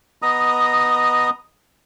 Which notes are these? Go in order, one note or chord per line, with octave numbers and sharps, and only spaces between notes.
B3 D#5 A#5 D#6